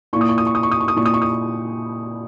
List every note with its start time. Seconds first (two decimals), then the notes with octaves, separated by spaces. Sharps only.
0.13 A#2 A#3 E4 C#6
0.21 D#6
0.29 C#6
0.38 D#6
0.47 C#6
0.55 D#6
0.63 C#6
0.71 D#6
0.80 C#6
0.88 D#6
0.96 A#2 A#3 E4 C#6
1.05 D#6
1.14 C#6
1.22 D#6